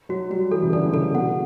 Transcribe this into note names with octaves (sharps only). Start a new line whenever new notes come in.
F#3 F#4
G3 F#4
E3 A4
C#3
D3 A4
D3
C#3 A4
B2 F#5